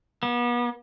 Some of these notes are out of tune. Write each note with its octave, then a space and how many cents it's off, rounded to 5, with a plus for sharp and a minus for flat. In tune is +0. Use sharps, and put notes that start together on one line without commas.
B3 -35